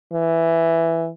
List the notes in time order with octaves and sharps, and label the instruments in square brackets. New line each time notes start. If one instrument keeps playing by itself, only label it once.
[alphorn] E3